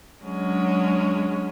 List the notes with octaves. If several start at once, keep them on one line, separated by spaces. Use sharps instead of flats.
F#3 G#3 C#4 D4